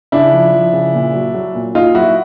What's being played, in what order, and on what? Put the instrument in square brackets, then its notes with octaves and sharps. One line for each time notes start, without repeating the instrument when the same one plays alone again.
[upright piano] C#3 D4 E4
F3
F3
C#3
A#2
F#3
F#3
A#2
A#2 D#4 F4
F#3 E4 F#4